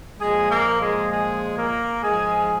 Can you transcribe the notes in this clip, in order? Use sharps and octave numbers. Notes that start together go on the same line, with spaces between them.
A#2 F3 G#3 G#4
A#3 A#4
G#3 G#4
G#3 G#4
A#3 A#4
G#2 F3 G#3 G#4